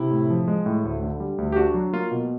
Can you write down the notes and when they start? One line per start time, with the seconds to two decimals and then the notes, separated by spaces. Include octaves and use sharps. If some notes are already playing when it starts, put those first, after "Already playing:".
Already playing: C3 E4
0.11 A2
0.30 F3
0.48 G#3
0.66 A2
0.84 D2
1.03 D3
1.20 G3
1.38 D2
1.52 G4
1.56 D4 F#4
1.74 F#3
1.93 A#3 F4
2.11 B2